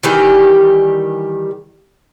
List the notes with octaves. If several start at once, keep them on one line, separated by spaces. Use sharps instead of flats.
D#3 E3 G3 G4